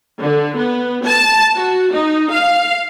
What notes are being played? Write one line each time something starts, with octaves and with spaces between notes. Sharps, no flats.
D3
B3
A5
F#4
D#4
F5